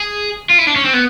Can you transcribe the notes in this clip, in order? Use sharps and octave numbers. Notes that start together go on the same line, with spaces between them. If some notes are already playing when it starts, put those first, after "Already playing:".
Already playing: G#4
F4
E4
D4
C#4
C4
B3